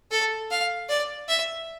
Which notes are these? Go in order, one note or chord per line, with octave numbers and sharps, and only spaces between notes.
A4
F5
D5
E5